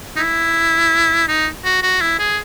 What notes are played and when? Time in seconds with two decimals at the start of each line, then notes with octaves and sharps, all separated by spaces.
0.16 D#4
0.19 E4
1.28 D#4
1.65 F#4
1.83 F#4
2.01 E4
2.19 G#4